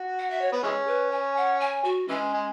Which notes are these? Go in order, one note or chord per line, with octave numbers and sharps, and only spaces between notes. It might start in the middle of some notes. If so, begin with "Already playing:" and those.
Already playing: F#4
F#5
E5
C#5
B3 B4
E3 G#3 C#4 G#4
B4
G#5
F#5
G#5
F#4
E3 G#3 C#4
G#3